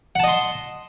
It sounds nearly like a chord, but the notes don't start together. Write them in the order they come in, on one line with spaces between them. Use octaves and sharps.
F#5 A5 D#5 C6